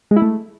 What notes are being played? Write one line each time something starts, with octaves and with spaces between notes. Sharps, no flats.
G#3
E4
A3